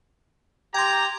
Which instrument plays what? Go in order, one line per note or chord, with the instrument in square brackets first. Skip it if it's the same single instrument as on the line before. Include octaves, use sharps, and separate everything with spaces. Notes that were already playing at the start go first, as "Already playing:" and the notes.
[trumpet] G4 [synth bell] G5 C6 [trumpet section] A#5 [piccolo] G#6